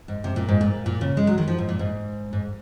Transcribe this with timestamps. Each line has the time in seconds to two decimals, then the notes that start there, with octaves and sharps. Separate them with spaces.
0.08 G#2
0.24 C3
0.36 A#2
0.48 G#2
0.61 A#2
0.86 A#2
1.01 C#3
1.17 G#3
1.27 F#3
1.38 D#3
1.48 F3
1.58 G#2
1.69 A#2
1.79 G#2
2.33 G#2